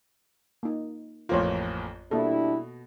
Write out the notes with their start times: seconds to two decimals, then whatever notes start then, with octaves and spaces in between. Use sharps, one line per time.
0.63 A#3 D#4
1.29 A1 F2 A#3 F4 C5 C#5
2.11 B2 G3 A#3 D4 E4 A4